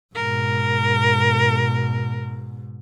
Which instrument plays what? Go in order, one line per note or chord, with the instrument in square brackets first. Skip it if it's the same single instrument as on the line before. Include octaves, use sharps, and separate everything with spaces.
[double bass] G#2 B2 [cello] A#4